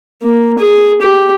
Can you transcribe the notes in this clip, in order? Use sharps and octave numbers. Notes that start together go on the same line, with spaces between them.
A#3
G#4
G4